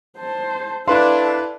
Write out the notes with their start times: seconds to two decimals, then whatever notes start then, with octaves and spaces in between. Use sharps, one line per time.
0.18 C5 A5
0.88 D4 E4 A4 B4 D5 F5 C6